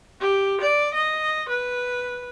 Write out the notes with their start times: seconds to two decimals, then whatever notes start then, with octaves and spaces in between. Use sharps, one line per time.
0.21 G4
0.61 D5
0.94 D#5
1.49 B4